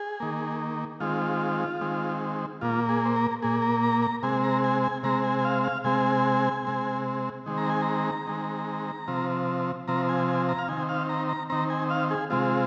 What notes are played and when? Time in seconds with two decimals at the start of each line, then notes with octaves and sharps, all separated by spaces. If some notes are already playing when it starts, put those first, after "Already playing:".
Already playing: G#4
0.20 D#3 A#3
1.00 D#3 G#3 C4 F4
1.81 D#3 G#3 C4
2.61 A#2 A#3 F4
2.89 G#4
3.05 C5
3.16 A#4
3.42 A#2 A#3 G#4
3.62 A#4
3.83 A#5
4.02 A#5
4.23 C3 G#3 C4 G#5
4.43 A#5
4.64 G#5
4.84 G#5
5.03 C3 G#3 C4 A#5
5.23 G#5
5.39 G#5
5.45 F5
5.64 F5
5.84 C3 G#3 C4 G#5
6.65 C3 G#3 C4
7.46 D#3 G#3 C4
7.58 A#5
7.70 G#5
7.82 A#5
8.27 D#3 G#3 C4
9.08 C3 F3 C4
9.88 C3 F3 C4 A#5
10.09 G#5
10.28 G#5
10.49 A#5
10.58 F5
10.68 D#3 C4 G#5
10.89 F5
11.09 A#5
11.29 A#5
11.50 D#3 C4 A#5
11.70 G#5
11.90 F5
12.11 G#4
12.30 C3 G#3 C4 F4